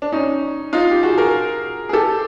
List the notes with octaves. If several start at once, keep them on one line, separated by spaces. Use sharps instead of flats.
D4
C#4 D#4
D#4 F4
G4
F#4 G#4
G#4 A#4
G#4
G4 A4